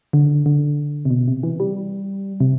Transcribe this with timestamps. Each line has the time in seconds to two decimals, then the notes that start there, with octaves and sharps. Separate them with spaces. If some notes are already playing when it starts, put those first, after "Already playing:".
0.13 D3
0.46 D3
1.05 C3
1.10 B2
1.28 C3
1.43 E3
1.60 G3
2.40 C3